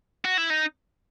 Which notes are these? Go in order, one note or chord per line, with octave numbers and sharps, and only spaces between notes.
F#4
E4
D#4